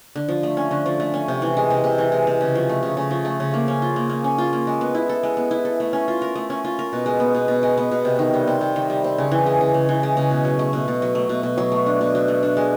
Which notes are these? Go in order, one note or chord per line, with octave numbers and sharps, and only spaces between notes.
D3
F3
A3
C#4
D3
F3
A3
C#4
C3
E3
G#3
C3
C3
E3
G#3
C3
C#3
F3
A3
C#3
C#3
F3
A3
C#3
A#3
C#4
F4
A#3
A#3
C#4
F4
A#3
G#3
B3
E4
A4
G#3
B3
E4
A4
A3
C#4
F4
A#4
A3
C#4
F4
A#4
B2
G#3
B3
B2
B2
G#3
B3
B2
C3
D#3
G3
C4
C3
D#3
G3
C4
C#3
E3
G#3
C#3
C#3
E3
G#3
C#3
B2
F#3
A3
B2
B2
F#3
A3
B2
B2
F#3
A3
D4
B2
F#3
A3
D4
G#3